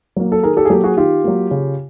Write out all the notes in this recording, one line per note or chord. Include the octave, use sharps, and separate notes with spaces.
F#3 A#3
A4
D#3 G#4 A#4
G4 A4
G#4
F#3 A#3 G4 A4
F#4 G#4
D#3 F4 G4
F#3 A#3
C#3